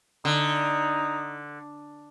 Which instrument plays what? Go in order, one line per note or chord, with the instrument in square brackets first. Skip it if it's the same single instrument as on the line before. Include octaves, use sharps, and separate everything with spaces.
[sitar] D3 [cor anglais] D#4